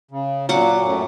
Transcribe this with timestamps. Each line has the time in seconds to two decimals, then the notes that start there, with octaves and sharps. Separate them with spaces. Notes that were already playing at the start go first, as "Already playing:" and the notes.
0.11 C#3
0.49 A#2 F#3 F#5 D6
0.84 F#2 A2